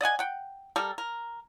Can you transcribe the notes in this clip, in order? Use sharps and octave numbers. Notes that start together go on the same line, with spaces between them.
D5 D#5 F#5 G#5
F#5 G5
G3 A4 A#4
A#4